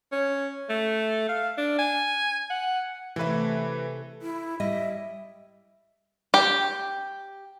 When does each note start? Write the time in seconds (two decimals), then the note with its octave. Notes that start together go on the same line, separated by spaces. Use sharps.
0.12 C#4
0.69 A3
1.28 F5
1.57 D4
1.78 G#5
2.50 F#5
3.16 C3 E3 A3 B4 E5
4.22 E4
4.60 G3 G4 D#5 E5
6.34 G4